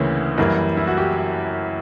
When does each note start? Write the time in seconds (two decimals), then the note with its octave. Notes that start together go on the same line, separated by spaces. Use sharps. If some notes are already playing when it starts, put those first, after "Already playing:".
Already playing: D2 C#3 E3 A#3 C#4
0.38 F#2 E3 G3 A#3
0.77 E4
0.87 F#4
0.98 G4